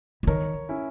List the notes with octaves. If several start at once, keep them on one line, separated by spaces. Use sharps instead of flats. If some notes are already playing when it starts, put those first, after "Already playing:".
E3
D#3 A#4 C#5
C#4 E4